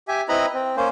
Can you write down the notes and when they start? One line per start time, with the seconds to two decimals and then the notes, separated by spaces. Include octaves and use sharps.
0.08 G4 E5 G#5
0.29 C4 E4 B4 D#5 A#5 B5
0.54 C4
0.76 A#3 C#4 C5